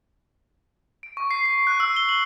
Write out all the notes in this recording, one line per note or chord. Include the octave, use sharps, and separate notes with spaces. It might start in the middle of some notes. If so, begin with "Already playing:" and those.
D7
C#6
C7
C7
F#6
E6
G7
F#7